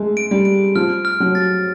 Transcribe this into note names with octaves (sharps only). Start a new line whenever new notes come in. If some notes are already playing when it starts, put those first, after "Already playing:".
Already playing: G#3 A3
D7
G3
D7
F3 F6
F6
F#3
A6